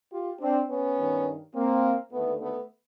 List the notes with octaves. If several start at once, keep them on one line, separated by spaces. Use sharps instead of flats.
F4 G4
C4 D4
B3 C#4
G2 D#3
A#3 C4
D#2 D3 A3 B3
A3 B3